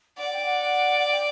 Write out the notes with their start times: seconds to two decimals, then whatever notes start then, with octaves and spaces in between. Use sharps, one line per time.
0.18 D5 F#5
0.32 G5
0.44 F#5
1.10 G5